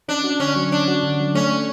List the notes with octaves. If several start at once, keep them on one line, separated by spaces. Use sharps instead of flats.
C#4 D4
F#4
D3 C#4
F#3
C#4 D4
F#4
D3
F#3
A3 C#4